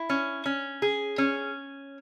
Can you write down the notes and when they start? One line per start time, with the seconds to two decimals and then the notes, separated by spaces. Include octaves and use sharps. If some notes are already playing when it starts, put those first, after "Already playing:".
Already playing: E4
0.10 C#4
0.46 C#4
0.82 G#4
1.18 C#4